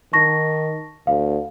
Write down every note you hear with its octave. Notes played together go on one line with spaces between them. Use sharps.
D#3 A5 C#6 A#6
D2 F5